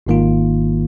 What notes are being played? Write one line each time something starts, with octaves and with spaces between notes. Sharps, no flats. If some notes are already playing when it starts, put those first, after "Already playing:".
G#1 G#2 D#3 A#3 F4